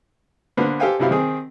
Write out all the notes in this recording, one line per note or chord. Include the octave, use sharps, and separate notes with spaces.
D3 A#3 B3 C5
G4 A4 C5 F5 G5 G#5
C2 F#2 E4 G4 F5
D#3 C4 G#4